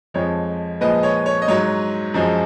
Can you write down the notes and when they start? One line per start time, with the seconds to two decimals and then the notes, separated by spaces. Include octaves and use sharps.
0.14 F2 F3 G#3 C#5
0.81 A#2 F3 G#3 B4 D#5
1.03 C#5
1.26 C#5
1.42 D#5
1.48 G#2 F#3 C#5
2.14 F#2 F3 G#3